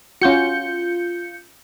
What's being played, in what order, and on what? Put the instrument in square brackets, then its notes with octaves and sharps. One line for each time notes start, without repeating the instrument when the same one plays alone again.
[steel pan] C#4 F#4 [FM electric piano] F4 G6 C#7